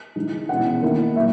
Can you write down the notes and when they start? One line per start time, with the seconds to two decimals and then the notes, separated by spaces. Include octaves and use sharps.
0.16 E3 G#3 D#4
0.49 B2 G#3 C#4 E4 F#5
0.82 D#3 A#3 E4
1.16 A#2 F#3 E5